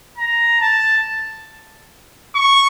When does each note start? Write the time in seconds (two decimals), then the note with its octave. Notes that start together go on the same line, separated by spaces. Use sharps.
0.17 A#5
0.61 A5
2.35 C#6